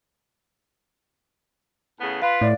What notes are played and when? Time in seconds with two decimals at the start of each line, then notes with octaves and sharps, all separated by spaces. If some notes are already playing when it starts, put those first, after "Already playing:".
1.99 A2 C#3 B3
2.22 F4 B4 F5
2.41 A2 D5